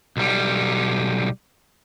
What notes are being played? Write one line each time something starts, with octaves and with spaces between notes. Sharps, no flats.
B1 G3